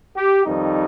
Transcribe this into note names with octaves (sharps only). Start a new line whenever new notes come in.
G4
F2 D#3 G3 D#4